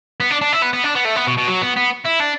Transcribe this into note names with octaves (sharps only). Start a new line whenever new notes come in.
B3
D4
D4
E4
B3
B3
D4
B3
A3
B3
B2
B2
F#3
B3
B3
E4
D4